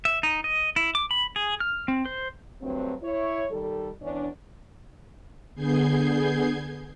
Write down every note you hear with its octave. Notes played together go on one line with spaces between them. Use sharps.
E5
D#4
D#5
E4
D6
B5
G#4
F6
C4
C5
D2 G2 F#3 C4
E4 C#5
D#3 G3 A4
E2 E3 C#4 D4
D3 B3 G#4 G6 G#6 C7